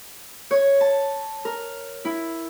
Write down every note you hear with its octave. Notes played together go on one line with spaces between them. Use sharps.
C#5
A5
A#4
E4